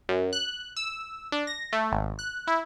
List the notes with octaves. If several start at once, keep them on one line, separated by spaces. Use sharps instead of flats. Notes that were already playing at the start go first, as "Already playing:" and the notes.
F#2
F#6
E6
D4
A#6
A3
G#1
F#6
E4